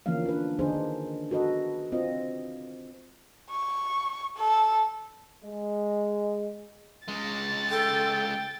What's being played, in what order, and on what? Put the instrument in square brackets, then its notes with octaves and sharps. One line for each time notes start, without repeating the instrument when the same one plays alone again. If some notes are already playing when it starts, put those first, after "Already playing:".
[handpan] D3 E3 F3 A#3 C#4 F5
D4 B4
D3 D#3 D4 D#4 G#4 C5
F#4 A4 B4 D#5
C4 F4 D#5
[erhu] C#6
A4
[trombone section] G#3
[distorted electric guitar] C#2 G#3 [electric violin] A6
[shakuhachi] A4 [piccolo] G5